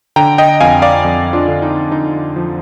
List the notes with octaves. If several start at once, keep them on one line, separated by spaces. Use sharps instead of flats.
D3 G5 A#5
D#5 G5
F2 F5 G#5
D5 F5
F2
D4 F4
D3
D#4
D3 D#4
F3